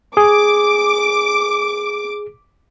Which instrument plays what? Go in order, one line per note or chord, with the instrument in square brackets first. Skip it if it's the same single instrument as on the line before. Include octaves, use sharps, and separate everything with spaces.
[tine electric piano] G#4 [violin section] D6